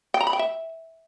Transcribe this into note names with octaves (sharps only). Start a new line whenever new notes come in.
G5
A#5
B5
G5
E5